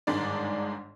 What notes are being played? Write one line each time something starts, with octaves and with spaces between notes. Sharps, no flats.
G1 G#2 D#3 G#3 D4 D5